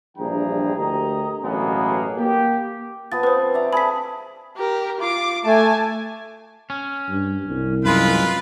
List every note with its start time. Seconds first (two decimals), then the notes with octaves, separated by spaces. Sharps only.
0.17 A#1 G2 E3 G#4 G5 A#5
0.77 D2 G4 A#4 D#5 A#5
1.43 A1 B2 F#3 A#3 B3 G#4
2.16 A#3 G4
3.12 F3 B3 B4 A6
3.23 C4 B4 C5
3.54 D5 E5 A#5
3.73 G#4 A4 A5 B5 B6
4.57 G4 A#4
5.00 F4 D6
5.45 A3 G#5 A5
6.70 C#4
7.09 G2
7.47 C2
7.85 F#2 G#3 F4 B4